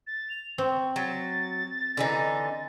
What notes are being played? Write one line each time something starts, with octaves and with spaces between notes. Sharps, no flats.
A6
F7
C4 C#6
F#3 A6
D3 E3 D#4